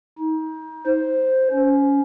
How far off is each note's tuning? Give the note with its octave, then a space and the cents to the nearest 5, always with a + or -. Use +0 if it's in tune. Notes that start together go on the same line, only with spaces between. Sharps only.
D#4 +30
C5 +0
C#4 +15